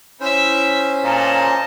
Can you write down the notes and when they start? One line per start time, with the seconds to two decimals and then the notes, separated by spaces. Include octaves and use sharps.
0.20 C#4 E4 C5 E5
1.04 A#2 D#5 A5